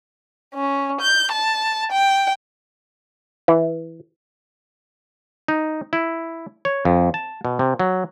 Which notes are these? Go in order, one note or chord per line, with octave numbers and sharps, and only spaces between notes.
C#4
G6
A5
G5
E3
D#4
E4
C#5
F2
A5
B2
C3
F#3